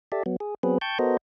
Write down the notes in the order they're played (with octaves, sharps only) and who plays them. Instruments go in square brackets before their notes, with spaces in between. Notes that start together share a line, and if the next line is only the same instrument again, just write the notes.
[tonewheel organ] G4 A4 D5 E5
F#3 B3
G#4
F#3 B3 C4 G#4 B4
G5 A5 C#6 G6
B3 F#4 A4 A#4 C5 D#5